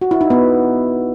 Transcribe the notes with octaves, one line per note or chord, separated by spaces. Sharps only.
F#4
E4
D#4
B3